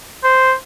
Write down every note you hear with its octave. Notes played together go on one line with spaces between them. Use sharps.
C5